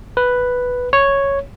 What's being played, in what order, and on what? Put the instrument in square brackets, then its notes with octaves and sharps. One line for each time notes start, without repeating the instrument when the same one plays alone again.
[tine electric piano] B4
C#5